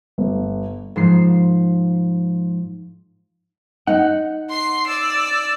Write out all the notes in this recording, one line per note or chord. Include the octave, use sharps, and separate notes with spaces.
G1
G#2 F3 C7
D#4 F#5
C6 C7
D5 E6